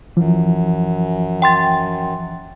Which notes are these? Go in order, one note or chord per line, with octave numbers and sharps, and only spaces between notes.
F#2 E3 F3
G5 C6 A6